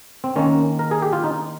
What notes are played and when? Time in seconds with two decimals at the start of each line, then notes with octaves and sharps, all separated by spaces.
0.24 C4
0.36 D#3 A#3 C#4
0.79 A#4
0.91 G#4
1.02 G4
1.13 F4
1.24 D#4